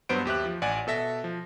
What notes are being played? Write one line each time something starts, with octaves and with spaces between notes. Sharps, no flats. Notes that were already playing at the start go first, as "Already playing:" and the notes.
G2 F#3 B3 C5 D7
D#2 G4 E5 F#6
F3
A1 D5 F#5 G#5
B2 A4 E5 A#6
F3